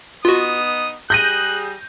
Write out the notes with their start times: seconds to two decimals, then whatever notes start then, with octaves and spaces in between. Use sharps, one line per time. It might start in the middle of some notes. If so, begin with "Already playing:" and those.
0.25 B3 D#4 F4 F#4 D#6
1.10 G3 G#4 F#6 G6 A#6 D#7